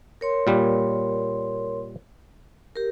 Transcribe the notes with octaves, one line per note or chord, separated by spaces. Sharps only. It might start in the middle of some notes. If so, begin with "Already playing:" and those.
A#4 C#5 C6
A#2 G3
G4 A#4